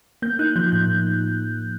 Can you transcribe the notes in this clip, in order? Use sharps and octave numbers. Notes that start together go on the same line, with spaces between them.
A#3 G6
D#4 F#6
F3 G6
A2 G6